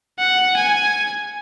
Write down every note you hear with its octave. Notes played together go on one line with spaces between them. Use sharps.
F#5
G#5